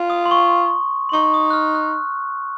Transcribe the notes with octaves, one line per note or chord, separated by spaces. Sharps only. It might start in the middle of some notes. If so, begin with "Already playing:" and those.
Already playing: F4
D#6
C6
C#6
C6
D#4 C#6
C#6
D#6
F#6
F6
F#6